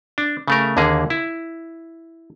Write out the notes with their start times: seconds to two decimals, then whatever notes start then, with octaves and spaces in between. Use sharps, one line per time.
0.18 D4
0.48 C#3 A3 A#4
0.77 D#2 D3 A#3 G#4
1.10 E4